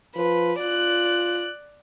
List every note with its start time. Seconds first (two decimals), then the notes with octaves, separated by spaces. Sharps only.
0.16 F3 B4
0.60 F4 D5 F#6